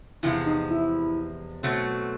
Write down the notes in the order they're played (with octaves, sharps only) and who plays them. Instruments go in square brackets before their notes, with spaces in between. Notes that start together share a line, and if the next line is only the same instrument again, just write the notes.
[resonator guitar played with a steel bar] E2 C3 F3 G#3 [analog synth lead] E4
[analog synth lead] D#4
E4
[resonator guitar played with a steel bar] B2 F#3 A3 C4